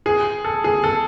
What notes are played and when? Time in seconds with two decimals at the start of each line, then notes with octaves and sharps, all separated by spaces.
0.06 G#4
0.45 A4
0.64 G#4
0.84 A4